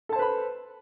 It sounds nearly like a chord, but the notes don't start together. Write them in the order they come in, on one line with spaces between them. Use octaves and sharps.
A4 A5 C5 B4 B5